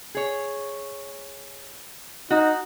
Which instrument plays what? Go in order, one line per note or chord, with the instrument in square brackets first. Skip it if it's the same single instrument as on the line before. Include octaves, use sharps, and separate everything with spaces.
[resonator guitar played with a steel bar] G#4 C#5
[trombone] D#4 [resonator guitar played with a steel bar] F#4